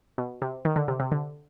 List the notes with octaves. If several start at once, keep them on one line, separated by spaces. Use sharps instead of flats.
B2
C3
D#3
D3
C3
C3
D3